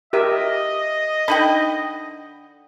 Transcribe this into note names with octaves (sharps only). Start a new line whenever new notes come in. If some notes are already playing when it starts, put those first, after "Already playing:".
G4 A#4 D#5 E5
D3 D#4 G5 B5